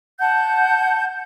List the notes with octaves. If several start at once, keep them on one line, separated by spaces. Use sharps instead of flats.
F#5 A5 G6